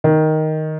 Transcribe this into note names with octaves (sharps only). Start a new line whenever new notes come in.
D#3